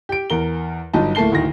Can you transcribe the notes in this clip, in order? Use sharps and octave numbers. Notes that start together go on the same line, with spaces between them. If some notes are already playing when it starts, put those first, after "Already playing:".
G4 D7
E2 A#4 G7
G1 G2 F#3 D#4 A5
D1 A3 A#3 A5 C7 G7
D1 D2 D#3 A#6